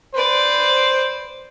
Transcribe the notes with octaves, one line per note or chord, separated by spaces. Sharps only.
B4 C5 D5